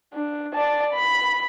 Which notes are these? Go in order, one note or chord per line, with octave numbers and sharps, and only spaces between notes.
D4
D5 A5
B5